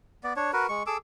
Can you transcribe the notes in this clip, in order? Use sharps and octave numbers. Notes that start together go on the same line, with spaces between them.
B3 D5
D4 C#5
F#4 A#4 B4
G#3 C#6
G#4 A4 D6 E6